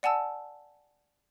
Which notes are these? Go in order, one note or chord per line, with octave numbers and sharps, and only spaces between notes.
D5 F#5 G#5 A5 E6